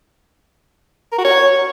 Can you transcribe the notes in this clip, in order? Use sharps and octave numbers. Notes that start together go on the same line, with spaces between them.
A#4
F#4
C#5